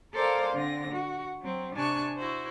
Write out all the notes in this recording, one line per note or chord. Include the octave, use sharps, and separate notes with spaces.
A4 A#4 C5 D5 F5 G#5
D3 C4 A#6
F#4
F#3 C4
C3 D4 G#5 A5 C#6 F#6
E4 F#4 C5